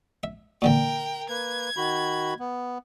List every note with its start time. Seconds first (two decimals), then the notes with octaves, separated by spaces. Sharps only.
0.23 E5
0.62 A#2 D3 E3 A#4 G5
1.29 A#3 B4 G#6
1.77 D#3 F#4 B5
2.39 B3